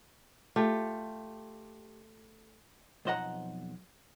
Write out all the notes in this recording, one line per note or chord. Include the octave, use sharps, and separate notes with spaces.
A3 F4 G4
B1 F2 C5 D#5 F#5 A#5